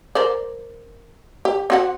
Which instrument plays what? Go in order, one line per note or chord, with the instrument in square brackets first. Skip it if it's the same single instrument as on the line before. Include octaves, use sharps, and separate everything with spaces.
[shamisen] A#4 C5 D5
G4
C4 F#4 F#5